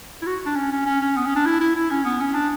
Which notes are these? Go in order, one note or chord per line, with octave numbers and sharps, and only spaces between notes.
E4
F#4
D4
C#4
C#4
C#4
C#4
B3
C#4
D4
E4
E4
E4
C#4
B3
C#4
D4